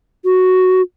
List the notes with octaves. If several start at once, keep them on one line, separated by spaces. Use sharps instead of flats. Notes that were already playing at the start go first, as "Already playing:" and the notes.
F#4